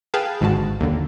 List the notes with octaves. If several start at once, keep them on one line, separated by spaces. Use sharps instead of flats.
G#4 B4 F5 G5 A5
G#1 G#2 D3 F#4 A5
D#2 D3